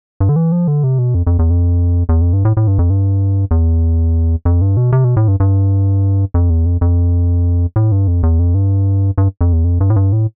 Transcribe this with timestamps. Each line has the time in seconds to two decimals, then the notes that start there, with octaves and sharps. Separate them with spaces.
0.20 G2
0.29 D3
0.36 E3
0.52 F3
0.68 D3
0.84 C3
0.99 B2
1.14 F2
1.27 F2
1.39 E2
1.50 F2
2.09 E2
2.21 F2
2.33 G2
2.45 A2
2.57 A2
2.67 G2
2.79 F2
2.90 G2
3.51 E2
4.45 F2
4.61 G2
4.77 B2
4.92 C3
5.04 B2
5.17 A2
5.28 G2
5.40 G2
6.34 F2
6.50 E2
6.66 F2
6.81 F2
7.76 A2
7.92 G2
8.08 F2
8.23 E2
8.39 F2
8.54 G2
9.18 G2
9.41 F2
9.53 E2
9.64 F2
9.80 G2
9.90 A2
9.96 G2
10.12 A2